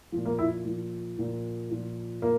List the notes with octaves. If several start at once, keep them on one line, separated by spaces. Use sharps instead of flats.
A#2 F3
A#3
E4
A#2 F3
A#2 F3
A#2 F3
A#2 A#3